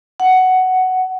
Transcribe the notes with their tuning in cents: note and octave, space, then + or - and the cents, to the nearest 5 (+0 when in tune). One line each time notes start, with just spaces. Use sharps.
F#5 +10